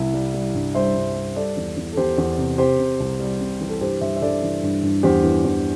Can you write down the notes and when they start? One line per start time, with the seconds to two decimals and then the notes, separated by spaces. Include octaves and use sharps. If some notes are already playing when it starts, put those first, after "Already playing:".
Already playing: C2 E4
0.14 G3
0.34 G3
0.54 G2
0.75 G3 C5 E5
0.95 G2
1.16 G3
1.36 G3 A4 D5
1.57 E2
1.77 E2
1.93 A4
1.97 E2 G4 C5
2.18 E2
2.38 C3
2.58 C3 G4 C5
2.79 C3
3.00 C2
3.20 G3
3.40 C3
3.61 E3
3.69 A4
3.81 G2 G4 C5
4.01 G2 C5 E5
4.16 E5
4.21 G2 A4 D5
4.43 E3
4.63 G2
4.83 G2
5.03 E2 G4 C5
5.24 E3
5.44 E2